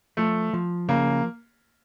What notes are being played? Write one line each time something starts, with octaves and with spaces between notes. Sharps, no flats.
F3 A3
F3
C#3 A#3